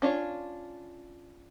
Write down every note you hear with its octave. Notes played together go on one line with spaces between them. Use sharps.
C#4 D4 F4 C#5